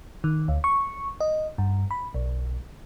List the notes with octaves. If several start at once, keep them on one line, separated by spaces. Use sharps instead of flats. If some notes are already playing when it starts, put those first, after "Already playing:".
D#3
D2
C#6
D#5
G2
B5
B1